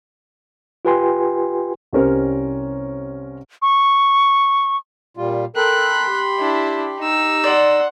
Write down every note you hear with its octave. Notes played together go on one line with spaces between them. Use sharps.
F4 G4 B4 G5 G#5 C6
C2 C3 C#4 A#4 C5 C#5
C#6
A#2 G3 F4
A4 A#4 G5 B5 C6 F#6
G4
D4 E4
D#4 E6
D5 F#5 C6